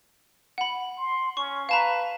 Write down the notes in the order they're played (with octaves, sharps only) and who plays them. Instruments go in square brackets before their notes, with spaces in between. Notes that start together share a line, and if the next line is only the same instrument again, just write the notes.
[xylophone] F#5 B5
[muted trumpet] C6
[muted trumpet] C#4 [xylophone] C#6
[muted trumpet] B4 [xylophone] F5 A5 A#5